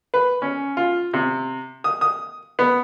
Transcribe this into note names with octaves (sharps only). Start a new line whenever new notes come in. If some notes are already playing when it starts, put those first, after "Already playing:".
B4
C#4
F4
C3
D#6
D#6
B3